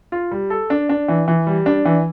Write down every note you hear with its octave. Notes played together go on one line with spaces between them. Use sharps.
F4
G3
A4
D4
D4
E3
E3
G3
D4
E3